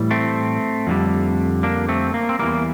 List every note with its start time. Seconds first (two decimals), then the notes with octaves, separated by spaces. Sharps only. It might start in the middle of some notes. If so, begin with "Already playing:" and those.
Already playing: A2 E3 G3
0.11 A3 C4
0.87 F2 D3 G3
1.63 A#3 D4
1.89 A3 C4
2.14 A#3
2.29 C4
2.39 E2 E3 G3 A#3